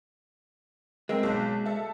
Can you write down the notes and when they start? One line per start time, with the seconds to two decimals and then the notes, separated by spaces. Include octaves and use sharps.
1.09 G#3 C4 A#4
1.23 B1
1.66 A4 E5